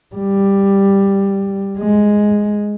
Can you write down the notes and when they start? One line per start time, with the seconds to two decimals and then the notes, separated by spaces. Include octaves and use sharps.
0.15 G3
1.78 G#3